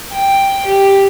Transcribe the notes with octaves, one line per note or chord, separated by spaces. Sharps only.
G5
G4